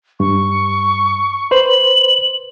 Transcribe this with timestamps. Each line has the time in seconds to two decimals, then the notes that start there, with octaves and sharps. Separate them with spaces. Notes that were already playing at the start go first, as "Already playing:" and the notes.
0.20 G2 C#6
1.51 B4 C5 F#7